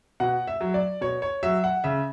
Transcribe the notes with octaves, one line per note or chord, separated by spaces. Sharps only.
B2 F#5
E5
F#3
D5
B2 C#5
C#5
F#3 E5
F#5
C#3 E5